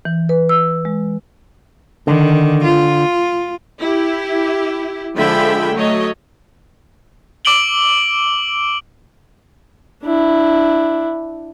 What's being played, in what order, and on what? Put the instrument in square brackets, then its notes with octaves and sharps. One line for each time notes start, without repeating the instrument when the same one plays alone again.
[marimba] E3
B4
E6
G#3
[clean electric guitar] D3 [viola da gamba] D#3
[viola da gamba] F4
[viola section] E4 G4
D3 F3 G#3 E5 G5 B5
F#3 A3 C#5 D#5
[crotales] D6 E6 D7 F#7 G7
[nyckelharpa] D4 E4